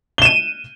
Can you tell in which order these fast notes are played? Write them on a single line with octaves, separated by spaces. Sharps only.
G7 E7 D#7